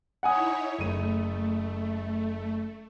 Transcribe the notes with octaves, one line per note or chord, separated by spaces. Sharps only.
D#4 E4 C#5 F#5 G#5 D#6
F#1 A3 D#7